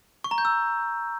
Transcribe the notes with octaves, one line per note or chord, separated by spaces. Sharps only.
C#6
A#5
G6
E6